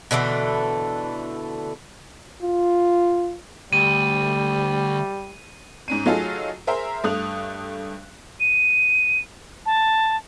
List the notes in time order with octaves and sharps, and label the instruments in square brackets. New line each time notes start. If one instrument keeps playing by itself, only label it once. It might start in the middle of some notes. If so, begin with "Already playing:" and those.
[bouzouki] B2 D3 E3 A3
[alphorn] F4
[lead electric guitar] D2 [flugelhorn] G3 [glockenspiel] D#7
[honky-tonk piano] G#2 C#4 D#7
F#3 A3 D#4 F4 G#4 A4
G#4 A#4 C5 E5 A#5 C6
G2 A3 D#6 F#6 F7
[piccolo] D#7
A5